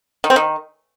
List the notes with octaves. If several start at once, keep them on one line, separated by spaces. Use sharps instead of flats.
D#3
C4
D#3